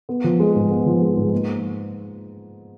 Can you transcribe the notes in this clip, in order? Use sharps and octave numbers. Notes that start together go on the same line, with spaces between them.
B3
F3
G#3
G#2
B3
F3
G#3
G#2
A#3